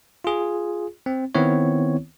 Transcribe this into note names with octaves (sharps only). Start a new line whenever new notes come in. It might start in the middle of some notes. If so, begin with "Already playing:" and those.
F4 G#4
C4
D#3 B3 C4 E4 C#5